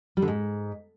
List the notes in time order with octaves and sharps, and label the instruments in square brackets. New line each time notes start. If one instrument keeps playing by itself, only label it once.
[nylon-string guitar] G3
D3
G#2